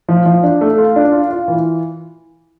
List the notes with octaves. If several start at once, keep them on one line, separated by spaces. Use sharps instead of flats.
F3
F3
D4
A3
F4
D4
F4
F4
E3